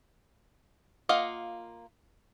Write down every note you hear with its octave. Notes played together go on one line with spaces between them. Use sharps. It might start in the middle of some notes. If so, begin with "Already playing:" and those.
A#3 F4 D#5 F5 F#5